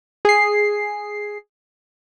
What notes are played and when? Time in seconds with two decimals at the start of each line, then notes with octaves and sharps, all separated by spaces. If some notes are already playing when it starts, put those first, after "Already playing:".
0.25 G#4 C7